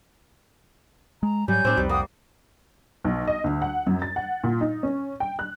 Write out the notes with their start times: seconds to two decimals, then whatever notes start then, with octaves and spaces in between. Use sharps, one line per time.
1.23 G#3 A#5
1.48 G#2 F#3 G3 C#5 G#5 G6
1.65 A2 C4 D4 D#4
1.77 C2 F2 G3 B4
1.89 A#3 F#5 G5 D#6
3.05 B1
3.27 D#5
3.44 D2
3.62 F#5
3.87 F#2
4.02 A6
4.16 F#5
4.44 A#2
4.61 D#4
4.83 C#4
5.20 G5
5.39 F#6